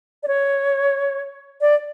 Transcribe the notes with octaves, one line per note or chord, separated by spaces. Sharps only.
D5
C#5
D5